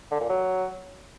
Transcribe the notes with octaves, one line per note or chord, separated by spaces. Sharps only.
D3
A#2
F#3